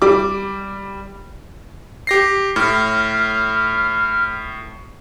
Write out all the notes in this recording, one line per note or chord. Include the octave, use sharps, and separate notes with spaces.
G3 D6
G4 A#6 C7
A2 F6